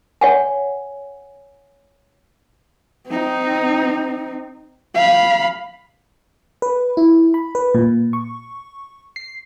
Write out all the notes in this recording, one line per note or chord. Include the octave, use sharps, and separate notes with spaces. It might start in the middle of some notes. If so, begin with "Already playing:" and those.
C#5 F#5 G#5
C4 D#4
F5 B5
B4
E4
B5
B4
A#2
C#6
C7